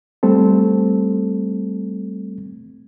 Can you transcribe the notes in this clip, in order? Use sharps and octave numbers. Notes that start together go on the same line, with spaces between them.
G3 A3 C4 A4